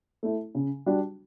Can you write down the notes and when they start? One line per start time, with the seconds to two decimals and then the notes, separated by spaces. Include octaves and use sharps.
0.23 A3 E4
0.55 C#3
0.86 G3 D4 F#4